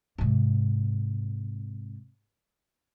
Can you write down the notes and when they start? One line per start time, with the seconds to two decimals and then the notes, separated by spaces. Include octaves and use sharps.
0.18 G#2 C3